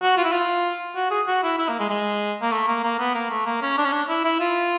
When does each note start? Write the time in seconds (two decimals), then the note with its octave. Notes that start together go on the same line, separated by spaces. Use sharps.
0.02 F#4
0.17 F4
0.24 E4
0.32 F4
0.96 F#4
1.11 G#4
1.27 F#4
1.43 E4
1.58 E4
1.69 A#3
1.80 G#3
1.90 G#3
2.42 A#3
2.52 A3
2.68 A#3
2.83 A#3
2.99 B3
3.14 A#3
3.30 A3
3.46 A#3
3.62 C#4
3.78 D4
3.85 C#4
3.92 D4
4.09 E4
4.24 E4
4.40 F4